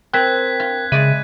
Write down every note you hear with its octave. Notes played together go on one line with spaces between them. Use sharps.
C4 A#4 G5 F#6 G#6 B6
F4
C#3 G#3 D5 E5 B5 D#7